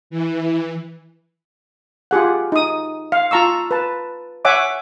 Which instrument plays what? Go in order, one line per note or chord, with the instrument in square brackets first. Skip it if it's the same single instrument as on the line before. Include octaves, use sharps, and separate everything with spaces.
[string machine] E3
[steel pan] F4 G4 G#4 F#5
D#4 D#6
F5
F4 A5 A#5 C#6 E6
B4 A5
C#5 E5 F#5 G#5 D6